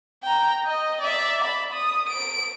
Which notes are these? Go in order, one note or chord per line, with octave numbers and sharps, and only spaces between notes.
G5 A#5
D#5
D5 E5
B5
D#6
D7